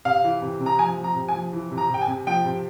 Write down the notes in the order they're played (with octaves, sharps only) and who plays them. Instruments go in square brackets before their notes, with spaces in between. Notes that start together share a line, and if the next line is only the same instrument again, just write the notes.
[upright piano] C3 F5
E3
C3
C3
A#5
F3 G#5
F3
A#5
C3
G#5
F3
E3
C3
A#5
C3 G5
G#5
C3
F3 G5
C3